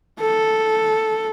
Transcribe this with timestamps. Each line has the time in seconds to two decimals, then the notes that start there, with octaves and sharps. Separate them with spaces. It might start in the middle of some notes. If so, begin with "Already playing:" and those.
0.21 A4